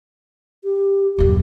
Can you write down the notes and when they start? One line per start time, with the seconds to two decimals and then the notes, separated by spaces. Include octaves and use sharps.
0.64 G4
1.18 D#1 F#2 G4